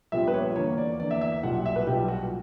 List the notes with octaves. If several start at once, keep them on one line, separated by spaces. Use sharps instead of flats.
A#1 A#2 G3 B3 E5
B4
C#5
E2 D3 A#3 C#5
D5
E2 D3 A#3 D5
E5
E5
E5
B1 A#2 G3 F#5
F#5
E5
B4
B1 A#2 G3 G4
F#4